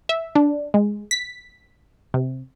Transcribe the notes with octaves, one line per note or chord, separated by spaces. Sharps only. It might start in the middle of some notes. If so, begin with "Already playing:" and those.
E5
D4
G#3
B6
C3